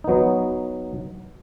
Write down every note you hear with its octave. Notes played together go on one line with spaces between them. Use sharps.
F#3 B3 D#4